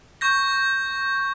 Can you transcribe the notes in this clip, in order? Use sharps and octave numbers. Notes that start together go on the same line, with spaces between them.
C#6 G6 A#6